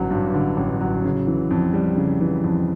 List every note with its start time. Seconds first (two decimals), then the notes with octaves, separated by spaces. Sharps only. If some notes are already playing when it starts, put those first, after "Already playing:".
Already playing: A1 G2 D3 F#3
0.11 G2
0.34 D3
0.57 A1
0.81 F#3
1.04 C#3
1.27 E3
1.51 F2
1.74 G3
1.97 C#3
2.21 E3
2.44 F2